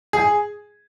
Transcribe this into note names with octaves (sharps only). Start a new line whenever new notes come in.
G#4